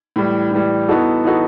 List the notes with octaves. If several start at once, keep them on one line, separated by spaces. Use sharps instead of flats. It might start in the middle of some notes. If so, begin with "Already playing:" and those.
A2 E3 G3
A2 E3 G3
E3 B3 D#4 F#4 A4
E3 B3 D#4 F#4 A4